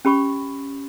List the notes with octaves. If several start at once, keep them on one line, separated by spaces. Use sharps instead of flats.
C#4 G4 B5 C#6